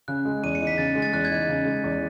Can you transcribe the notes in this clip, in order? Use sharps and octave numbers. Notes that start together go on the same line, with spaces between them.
C#3 F#6
G#3
E2 D#7
C#7
D#4
B6
C#3 A6
G#3
A6
E2 F#6
G#6
D#4
C#3
G#3
E2